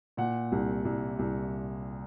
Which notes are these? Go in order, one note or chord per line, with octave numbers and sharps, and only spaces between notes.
A#2 F#5
C2
C2
C2